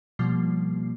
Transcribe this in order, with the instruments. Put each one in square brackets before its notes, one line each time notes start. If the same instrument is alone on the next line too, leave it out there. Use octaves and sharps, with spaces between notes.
[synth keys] B2 F3 G3 A#3 C7